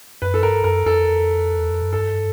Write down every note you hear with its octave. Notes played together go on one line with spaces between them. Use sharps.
F#2 B4
A4
G2 A#4
F#2 A#4
F2 A4
E2
F2
F#2
G2 A4